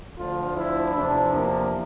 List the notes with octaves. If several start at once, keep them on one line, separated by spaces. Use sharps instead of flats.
D2 D3 F3 F4
E4
E2 C3 F3 D4
A#3